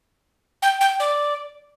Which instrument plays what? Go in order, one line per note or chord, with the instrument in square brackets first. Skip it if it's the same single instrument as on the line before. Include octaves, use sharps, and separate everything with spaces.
[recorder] G5
G5
D5